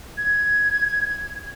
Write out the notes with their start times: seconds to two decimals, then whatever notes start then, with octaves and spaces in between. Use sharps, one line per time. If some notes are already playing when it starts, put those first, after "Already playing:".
0.17 G#6